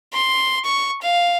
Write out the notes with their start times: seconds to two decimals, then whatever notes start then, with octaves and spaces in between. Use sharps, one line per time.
0.13 C6
0.64 C#6
1.02 F5